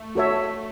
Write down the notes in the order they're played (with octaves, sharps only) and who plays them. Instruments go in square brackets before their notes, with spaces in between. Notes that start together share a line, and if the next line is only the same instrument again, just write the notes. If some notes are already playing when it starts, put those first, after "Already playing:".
Already playing: [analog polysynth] A3
[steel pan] F#4 A4 C#5 E5